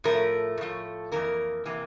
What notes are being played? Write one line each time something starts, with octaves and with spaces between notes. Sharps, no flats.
A2 F3 A3 A#4
A2 F3 A3
F2 C3 E3 A#3 A#4
C3 E3 A#3